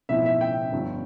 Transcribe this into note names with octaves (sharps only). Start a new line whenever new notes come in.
B1 A2 F3 C4 E4 E5
E5
G5
G1 G2 F3